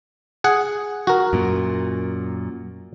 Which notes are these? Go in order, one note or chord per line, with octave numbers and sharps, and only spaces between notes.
G#4 F#5
F#4 A#4
F#2 A#2